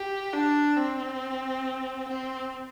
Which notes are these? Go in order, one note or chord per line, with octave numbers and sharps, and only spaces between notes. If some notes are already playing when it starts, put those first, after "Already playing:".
Already playing: G4
D4
C4
C4